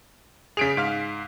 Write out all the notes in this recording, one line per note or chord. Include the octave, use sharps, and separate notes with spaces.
C#3 G#4 B6 D7 F7
G#2 F5 F6